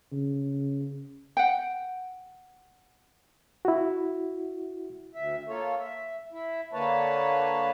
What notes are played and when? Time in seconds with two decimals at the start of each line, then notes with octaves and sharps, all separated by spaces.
0.12 C#3
1.37 F#5 G5
3.65 E4 F#4
5.15 D2 E5
5.48 A#3 F4 A4 C#5
5.79 E5
6.32 E4
6.73 D3 A#3 B4 C#5 A5